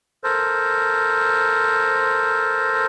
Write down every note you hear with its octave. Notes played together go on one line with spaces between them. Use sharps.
A4 A#4 C5